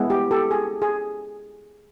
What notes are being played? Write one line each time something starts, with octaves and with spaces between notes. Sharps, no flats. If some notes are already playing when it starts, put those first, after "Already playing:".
Already playing: G#3 B3 E4
G4
G4 A4
G#4
G#4